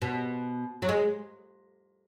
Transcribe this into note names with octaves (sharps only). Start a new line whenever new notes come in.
B2
F#3
G#3